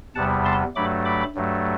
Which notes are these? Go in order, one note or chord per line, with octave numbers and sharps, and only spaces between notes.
E2 C3 G3 B3 F#5 A5
A5 C6
G2 F#3 A3 B5 D6
B5 D6
G2 F#3 A3